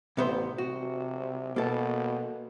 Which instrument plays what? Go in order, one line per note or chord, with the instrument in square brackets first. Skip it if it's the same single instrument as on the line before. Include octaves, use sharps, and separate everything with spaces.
[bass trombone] A1 [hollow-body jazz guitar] C3 B3 C5
[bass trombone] C3 [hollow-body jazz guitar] F#4
[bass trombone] B2 [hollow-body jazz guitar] A#3 A4